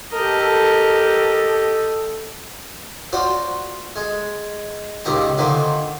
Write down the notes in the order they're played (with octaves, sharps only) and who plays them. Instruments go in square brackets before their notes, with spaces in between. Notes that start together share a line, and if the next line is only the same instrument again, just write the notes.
[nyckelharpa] G4 D#5 [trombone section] A4 [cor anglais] A#4
[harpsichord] F4 F#4 C5 D5
G#3
C#2 A#2 D#3 G4 A#5
A#2 D3 D#3 A#3 C5